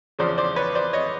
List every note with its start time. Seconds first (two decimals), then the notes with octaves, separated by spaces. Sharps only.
0.19 E2 C#3 F3 C5 D5
0.38 C5 D5
0.56 B4 C#5
0.75 C5 D5
0.93 C#5 D#5